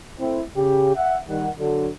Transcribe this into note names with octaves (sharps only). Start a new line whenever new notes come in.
A3 C4 E4
C#3 G4
E5 F#5
D#3 G3 F#5
D3 F#3